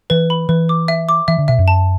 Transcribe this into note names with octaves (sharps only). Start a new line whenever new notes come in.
E3 B4
B5
E3 B4
D6
E5
D6
E3 E5
D3
B2 E5
F#2
A5